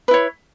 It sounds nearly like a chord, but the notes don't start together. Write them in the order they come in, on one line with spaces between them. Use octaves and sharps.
B4 E4 C#5